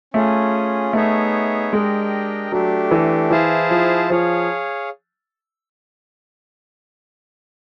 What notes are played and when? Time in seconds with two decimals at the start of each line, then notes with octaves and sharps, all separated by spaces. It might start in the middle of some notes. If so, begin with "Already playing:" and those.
0.14 A3 C#4 F4 G#4
0.93 A3 B3 D#4 G#4 C#5 E5
1.73 G#3 D4 G4 A#4 D#5 G5
2.52 F#3 A3 D4 G4
2.91 E3
3.30 E3 E4 G#4 C5 F5 A5
3.71 F3
4.10 F3 G#4 C#5 F5